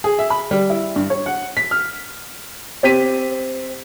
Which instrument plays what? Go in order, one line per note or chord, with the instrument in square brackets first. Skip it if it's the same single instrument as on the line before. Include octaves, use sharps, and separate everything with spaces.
[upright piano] G#4
E5
B5
G3
E4
G2
C#5
F#5
B6
F6
C4 G4 B6 D#7